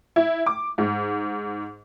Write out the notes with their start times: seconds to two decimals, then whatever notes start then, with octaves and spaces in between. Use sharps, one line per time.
0.16 E4
0.46 D6
0.78 G#2